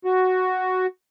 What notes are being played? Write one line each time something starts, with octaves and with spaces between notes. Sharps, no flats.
F#4